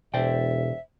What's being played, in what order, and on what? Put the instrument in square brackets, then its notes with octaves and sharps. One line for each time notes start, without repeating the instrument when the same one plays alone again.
[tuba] E1 [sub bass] B2 [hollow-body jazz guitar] C5 D5 G5 [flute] E5